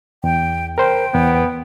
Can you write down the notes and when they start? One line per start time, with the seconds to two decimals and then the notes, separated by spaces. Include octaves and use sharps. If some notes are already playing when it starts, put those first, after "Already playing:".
0.24 E2 G5
0.78 A#4 C5 G5
1.14 E2 B3